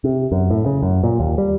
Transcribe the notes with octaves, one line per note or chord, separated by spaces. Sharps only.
C3
F#2
A2
C#3
F#2
A#2
D#2
G3